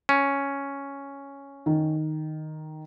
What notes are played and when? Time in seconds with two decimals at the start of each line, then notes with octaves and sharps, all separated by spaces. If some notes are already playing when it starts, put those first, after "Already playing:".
0.09 C#4
1.66 D#3